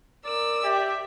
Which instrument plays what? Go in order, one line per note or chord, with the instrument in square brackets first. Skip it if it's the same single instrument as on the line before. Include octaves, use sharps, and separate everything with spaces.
[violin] A#4 E6 [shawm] D5
[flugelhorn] G4 [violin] E5